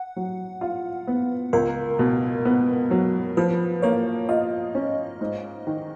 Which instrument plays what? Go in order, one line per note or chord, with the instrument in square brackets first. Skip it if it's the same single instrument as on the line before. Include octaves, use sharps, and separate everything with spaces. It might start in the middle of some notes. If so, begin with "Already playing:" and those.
Already playing: [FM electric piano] F#5
[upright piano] F#3
F4
B3
[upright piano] C#2 [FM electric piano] A#4
[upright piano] B2
B3
F#3
[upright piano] F3 [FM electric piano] B4
[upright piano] A#3 [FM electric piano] C#5
[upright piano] F4 [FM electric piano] D#5
[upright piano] C#4
G#2
D#3